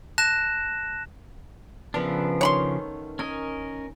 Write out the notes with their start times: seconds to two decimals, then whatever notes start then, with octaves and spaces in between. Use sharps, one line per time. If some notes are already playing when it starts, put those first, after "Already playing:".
0.18 A5 F#6 A#6 E7
1.94 C#3 F3 B3 D4 A#4 E5
2.41 D#3 A3 C#4 C#5 B5 C6
3.19 C#4 A#4 D#5 G#5